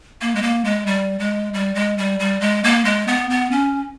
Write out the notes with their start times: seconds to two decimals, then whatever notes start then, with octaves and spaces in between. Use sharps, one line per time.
0.21 A#3
0.35 G#3
0.43 A#3
0.65 G#3
0.87 G3
1.20 G#3
1.54 G3
1.75 G#3
1.98 G3
2.20 G3
2.41 G#3
2.64 A#3
2.85 G#3
3.08 B3
3.30 B3
3.51 C#4